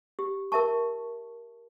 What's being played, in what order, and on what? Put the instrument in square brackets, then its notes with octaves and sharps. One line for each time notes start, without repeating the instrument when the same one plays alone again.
[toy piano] G4
A#4 E5 A5 C#6